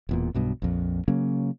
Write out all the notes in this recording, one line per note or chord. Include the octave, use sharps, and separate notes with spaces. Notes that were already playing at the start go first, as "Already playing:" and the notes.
E1 E2 A#2
B1 G2 B2
A#1 F2
C#3 F#3 A#3 C#4